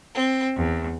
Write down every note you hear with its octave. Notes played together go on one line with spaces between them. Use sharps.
C4
E2